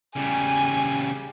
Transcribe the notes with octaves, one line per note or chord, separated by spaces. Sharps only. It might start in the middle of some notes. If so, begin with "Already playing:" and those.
C#3 G3 G#5